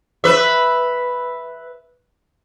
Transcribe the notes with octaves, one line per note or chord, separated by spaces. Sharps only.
B4 E5